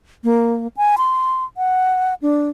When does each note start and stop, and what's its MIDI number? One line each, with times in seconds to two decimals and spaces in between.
0.24 0.68 58
0.77 0.96 80
0.98 1.45 84
1.57 2.14 78
2.22 2.50 62